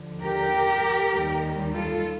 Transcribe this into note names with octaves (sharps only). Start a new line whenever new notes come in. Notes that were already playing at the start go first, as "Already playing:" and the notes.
Already playing: D#2 D3 F3
G4 A#4
D#2 D#3 G3
F4 A4